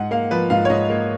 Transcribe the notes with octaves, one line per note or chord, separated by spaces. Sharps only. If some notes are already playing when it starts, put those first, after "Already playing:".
Already playing: G#2 F#5
A#3 F5
F3 B4
G#2 F5
C#5
G#2 D#5
A#3